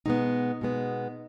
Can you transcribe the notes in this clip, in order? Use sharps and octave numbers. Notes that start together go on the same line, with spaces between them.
B2 G#3 B3 D#4
B2 G#3 B3